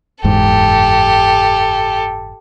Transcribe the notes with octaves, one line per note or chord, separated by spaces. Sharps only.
F#1 E2 G#2 G4 A4